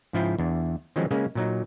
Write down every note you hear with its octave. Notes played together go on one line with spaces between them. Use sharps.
G#2 C#3 F3 E4 F4 G5
E2 D4
D#3 F3 F#3 G#3 C4 C#4
C#3 G#3 A#3 C#4
A#2 F#3 D#4